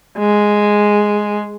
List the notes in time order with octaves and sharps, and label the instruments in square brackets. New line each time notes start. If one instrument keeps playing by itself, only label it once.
[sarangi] G#3